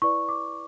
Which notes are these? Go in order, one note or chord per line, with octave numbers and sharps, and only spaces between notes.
E4 B4 D5 C#6
D6